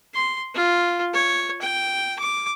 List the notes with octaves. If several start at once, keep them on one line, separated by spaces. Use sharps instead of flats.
C6
F4
C#5
G5
D6